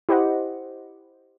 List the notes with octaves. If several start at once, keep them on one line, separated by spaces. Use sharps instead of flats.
E4 G4 C5 D#5 F#5